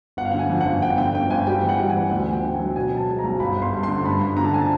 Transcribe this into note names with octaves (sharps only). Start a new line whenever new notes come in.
G1 F#5
F5
F#5
D3 G#5
F2
F#5
G1
G1 G5
D3 G5
G1 G5
G1 G#5
G3 G5
E3
F#5
G3
G#5
E3
D2 F#5
D2
G5
D3
F#3 G#5
B2 G#5
B2
A5
G#3
A#5
B1
G1 B5
G1
C6
G2
D3 C6
G2 B5
G2
D3 A#5
A5
G#5
A5